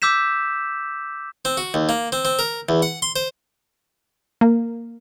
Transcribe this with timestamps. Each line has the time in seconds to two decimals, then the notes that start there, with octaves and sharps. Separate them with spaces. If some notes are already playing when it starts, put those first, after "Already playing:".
0.02 D6 E6 G6 B6 E7
1.45 C4
1.57 F#4
1.74 D#2
1.89 A#3
2.12 C4
2.25 C4
2.39 A#4
2.69 E2
2.82 F#5
3.02 C6
3.16 C5
4.41 A#3